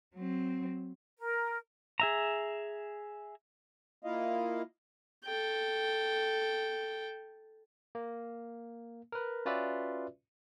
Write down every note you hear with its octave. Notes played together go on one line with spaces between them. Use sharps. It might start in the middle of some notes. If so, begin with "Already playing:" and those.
F#3 C4
A#4
G#4 E5 A#5
A#3 E4 F4 D#5 F5
A4 G5
A#3
A#4 B4
C#4 F4 F#4 B4 D5 E5